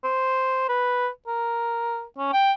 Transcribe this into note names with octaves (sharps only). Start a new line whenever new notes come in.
C5
B4
A#4
C#4
G5